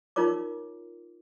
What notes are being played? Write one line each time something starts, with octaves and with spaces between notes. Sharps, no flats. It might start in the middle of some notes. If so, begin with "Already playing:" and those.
D#4 F4 A#4 C#5 D6